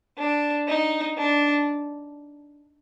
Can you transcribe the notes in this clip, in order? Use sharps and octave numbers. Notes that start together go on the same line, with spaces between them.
D4
D#4
D4